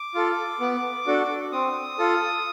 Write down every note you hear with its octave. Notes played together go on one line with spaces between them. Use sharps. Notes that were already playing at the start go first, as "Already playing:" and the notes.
Already playing: D6
F4 A4
B3
D4 F#4 A4
C4 D#6
F4 A4